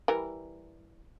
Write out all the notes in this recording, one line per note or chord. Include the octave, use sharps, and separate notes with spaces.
E3 G3 A#4